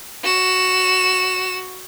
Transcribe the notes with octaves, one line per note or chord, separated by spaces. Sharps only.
F#4 E7